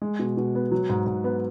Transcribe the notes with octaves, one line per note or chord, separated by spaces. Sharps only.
G#3
B2
B2
B3
F#3
G#2
G#2
B3